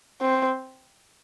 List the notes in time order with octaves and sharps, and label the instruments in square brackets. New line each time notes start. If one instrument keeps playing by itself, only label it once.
[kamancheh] C4